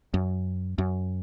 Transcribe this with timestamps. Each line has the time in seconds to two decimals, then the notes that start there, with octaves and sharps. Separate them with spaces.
0.14 F#2
0.78 F#2